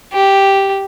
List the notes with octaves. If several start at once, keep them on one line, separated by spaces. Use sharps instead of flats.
G4